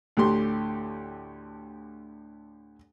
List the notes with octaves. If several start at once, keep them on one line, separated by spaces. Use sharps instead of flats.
D2 A2 G4 C6